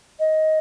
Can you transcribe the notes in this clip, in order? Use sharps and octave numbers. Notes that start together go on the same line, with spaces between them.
D#5